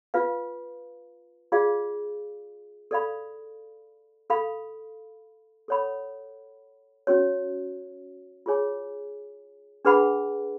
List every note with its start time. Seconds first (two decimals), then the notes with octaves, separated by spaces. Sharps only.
0.14 F4 B4 F5
1.52 F4 G#4 D5 F5
2.91 A4 D5 F5 B5
4.30 A4 F5 B5
5.68 A4 C#5 F#5 B5
7.07 C#4 F#4 C#5
8.46 F4 G#4 C#5 G#5
9.85 D4 G#4 B4 F#5 B5